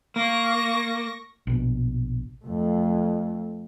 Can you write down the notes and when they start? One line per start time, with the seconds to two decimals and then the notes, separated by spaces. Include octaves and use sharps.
0.16 A#3 C#6 A#6
1.47 A#1 B2
2.45 F2 A3